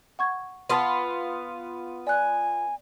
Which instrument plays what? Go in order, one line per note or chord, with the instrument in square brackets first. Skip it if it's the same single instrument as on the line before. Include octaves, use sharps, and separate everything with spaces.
[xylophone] F#5 C#6 G#6
[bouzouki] B3 F4 [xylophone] A5 D#7
[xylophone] D5 F#6 [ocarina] G#5